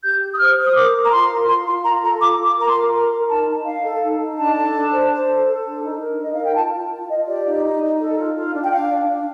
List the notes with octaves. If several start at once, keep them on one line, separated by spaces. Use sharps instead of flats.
G4 G6
G4
D#6
C5 F6
C5
D#6
A#4 D6
A#4
A#5
F4 C6
A#4
F4 C6
F4 C6
F4 A#5
A4 A#5
F4 D6
F4
D6
A#4 A#5
C6
A#4
A#4 A#5
A#4
D#4 A5
D#4
D#4 F5
A4
D#4
D#4
D4 A5
A4
D4
C5
C5
A4
A4
D4
D#4
A#4
D#4 D#5
A#4 F5
G5
F4 A5
F4
F4
F4 D#5
G4 D5
D#4
D#4
D#4
A4
F4
F4
D4
G5
D4 F5
D4
D4